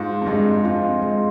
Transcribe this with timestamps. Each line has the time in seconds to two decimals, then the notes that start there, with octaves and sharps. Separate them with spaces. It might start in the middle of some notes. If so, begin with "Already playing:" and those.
Already playing: G#2 F4
0.22 F2
0.26 G2 G#3
0.65 F2 F4
1.02 G#3